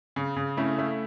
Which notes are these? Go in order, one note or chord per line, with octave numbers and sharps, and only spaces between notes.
C#3
C#3
A3 C#4 E4
A3